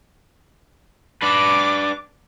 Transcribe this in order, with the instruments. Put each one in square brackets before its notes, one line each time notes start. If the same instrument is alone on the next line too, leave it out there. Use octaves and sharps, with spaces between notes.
[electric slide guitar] D4 B4 [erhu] D6